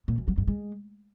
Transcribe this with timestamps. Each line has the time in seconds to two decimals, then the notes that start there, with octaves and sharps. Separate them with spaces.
0.08 A#2
0.18 F#2
0.28 F#3
0.38 G2
0.47 G#3